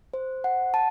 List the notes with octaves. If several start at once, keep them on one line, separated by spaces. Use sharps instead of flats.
C5
F#5
A5